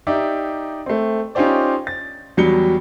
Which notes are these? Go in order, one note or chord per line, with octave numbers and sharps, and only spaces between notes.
D#4 G4 D5 E5
A3 C4
C#4 D#4 F4 G4 C5 D5
A6
E2 F#3 G3 C#7 G7